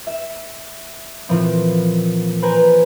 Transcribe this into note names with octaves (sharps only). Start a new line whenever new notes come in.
E5
A#2 E3 F3 C4
B4 C5 G5 G#5 A#5